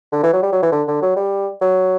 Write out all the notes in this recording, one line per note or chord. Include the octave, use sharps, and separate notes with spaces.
D3
E3
F#3
G3
F#3
E3
D3
D3
F#3
G3
F#3